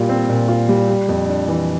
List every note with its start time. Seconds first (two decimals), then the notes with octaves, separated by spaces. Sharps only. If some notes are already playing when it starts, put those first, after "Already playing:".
Already playing: A#2 G3 F4
0.09 C4
0.29 A#2
0.48 F4
0.69 G3
0.89 G3
1.09 F2
1.28 D4
1.48 E3